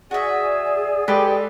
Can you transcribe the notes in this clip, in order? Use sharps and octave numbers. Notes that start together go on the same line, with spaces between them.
F#4 G#4 D5 E5 G#5
G#3 G4 A4 B4 B6